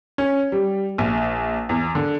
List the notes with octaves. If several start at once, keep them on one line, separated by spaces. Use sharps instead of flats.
C#4
G3
A#1
E2
D3